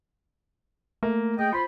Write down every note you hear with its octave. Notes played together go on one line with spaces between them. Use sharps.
A3 A#3
G#4 D#5 G5
F4 C5 B5 C6